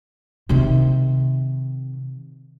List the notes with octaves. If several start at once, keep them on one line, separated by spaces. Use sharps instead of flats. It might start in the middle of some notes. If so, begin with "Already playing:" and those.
C3 D#3